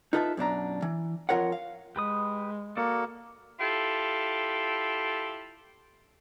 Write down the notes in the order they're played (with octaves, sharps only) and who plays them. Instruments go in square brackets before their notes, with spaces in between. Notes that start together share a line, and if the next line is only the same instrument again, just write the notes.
[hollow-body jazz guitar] D#4 F4 A4 B4 C#5 E5
F#2 B2 D4 A#5
E3
F2 D#3 F4 A#4 C#5 F#5
F5
[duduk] G#3 [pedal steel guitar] G4 B4 D#6
[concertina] A#3 [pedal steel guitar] F#4 A4 D5
[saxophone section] E4 F4 G4 A4